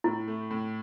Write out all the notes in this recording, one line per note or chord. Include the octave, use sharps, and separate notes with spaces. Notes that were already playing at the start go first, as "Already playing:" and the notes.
A2 E4
A3
A2